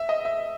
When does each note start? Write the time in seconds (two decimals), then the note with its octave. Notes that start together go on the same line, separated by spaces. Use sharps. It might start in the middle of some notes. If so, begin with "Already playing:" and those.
Already playing: E5
0.09 D#5
0.25 E5